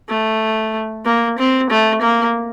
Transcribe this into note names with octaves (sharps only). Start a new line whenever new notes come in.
A3
A#3
C4
A3
A#3